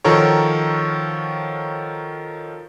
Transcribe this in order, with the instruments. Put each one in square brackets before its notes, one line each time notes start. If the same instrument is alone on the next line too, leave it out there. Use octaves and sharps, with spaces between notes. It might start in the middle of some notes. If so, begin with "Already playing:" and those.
[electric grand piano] D#3 F3 F#4 A4 A#4 C#5